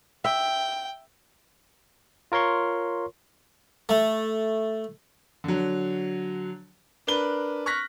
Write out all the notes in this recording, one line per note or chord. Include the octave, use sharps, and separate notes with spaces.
E5 G5
F4 A#4 C#5 C6 C#6
A3
D3 F#3
D4 A#4 B4 G7
C#6 F6 F#6 A#6 B6